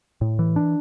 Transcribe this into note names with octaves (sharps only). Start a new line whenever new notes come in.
A2
E3
D4